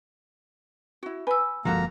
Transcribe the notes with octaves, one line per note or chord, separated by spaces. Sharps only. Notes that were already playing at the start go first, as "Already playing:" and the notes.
E4 F#4
B4 G#5 E6
G1 F3 G#3 A#3 F4 F#4 A4 A#5